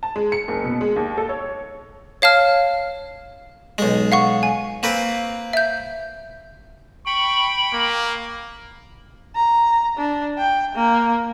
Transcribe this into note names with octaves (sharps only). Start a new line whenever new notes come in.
A5
G#3
C#7
F#1
B2
G#3
D#2
A4
C#5
C#5 F5 A5 F6
B1 G#3
F5 F#5 C#6
G#5
A#3 C4 B4
E5 G6
G5 B5 C#6
A#3
A#5
D4
G5
A#3